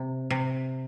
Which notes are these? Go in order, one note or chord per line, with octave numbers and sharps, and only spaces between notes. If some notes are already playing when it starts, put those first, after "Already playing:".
Already playing: C3
C3